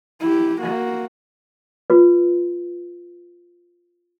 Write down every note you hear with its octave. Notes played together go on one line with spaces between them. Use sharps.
E4 G4
A#3 F#4
F4 B4